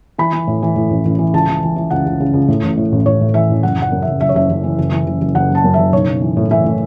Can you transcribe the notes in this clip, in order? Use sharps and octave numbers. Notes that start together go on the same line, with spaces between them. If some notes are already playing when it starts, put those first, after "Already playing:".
E3 B5
E3
A2
E3
A2
A1
A1
E3
C#2 A5
E3
E3
E3
C#2 F#5
C#2
C#3
C#2
A2
A1
A2
A1
A1 C#5
A2
E3 E5
A1
F#1 F#5
F#1 F#5
F#2
F#1 E5
F#1 E5
C#5
F#1 E5
F#1
E3
F#1
E3
F#1
F#1
F#1 F#5
F#1 A5
F#2
F#1 E5
B1 C#5
B1
E3
A2
E3 E5
A2